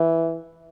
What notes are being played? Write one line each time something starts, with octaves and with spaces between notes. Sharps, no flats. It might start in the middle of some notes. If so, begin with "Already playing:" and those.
Already playing: E3